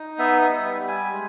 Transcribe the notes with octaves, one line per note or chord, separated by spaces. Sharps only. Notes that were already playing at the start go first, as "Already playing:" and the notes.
Already playing: D#4
B3 E5
E5
G3
E5
G3
G#5
G#3